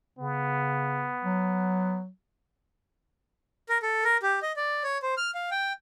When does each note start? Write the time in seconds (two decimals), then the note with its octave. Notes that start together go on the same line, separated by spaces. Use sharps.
0.19 C#3 B3
1.24 F#3
3.69 A#4
3.82 A4
4.04 A#4
4.22 G4
4.42 D#5
4.56 D5
4.83 C#5
5.02 C5
5.17 F6
5.35 F5
5.51 G5